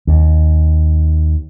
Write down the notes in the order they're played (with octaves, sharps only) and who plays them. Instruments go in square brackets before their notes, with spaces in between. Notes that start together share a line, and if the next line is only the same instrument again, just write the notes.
[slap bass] D#2